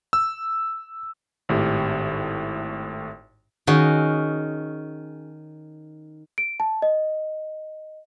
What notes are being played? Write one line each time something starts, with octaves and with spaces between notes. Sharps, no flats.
E6
G#1 A2 G4
D#3 C#4 F#4 G#4
D7
A5
D#5